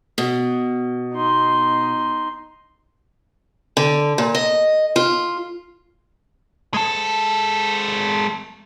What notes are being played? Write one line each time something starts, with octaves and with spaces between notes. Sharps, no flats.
B2
D#4 C6
D3
A#2
D#5
F4
G#3 A4